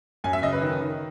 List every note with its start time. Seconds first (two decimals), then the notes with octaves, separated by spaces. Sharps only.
0.24 F#2 G#5
0.33 E5
0.42 C#3 D#5
0.53 B4
0.61 D#3
0.81 D#3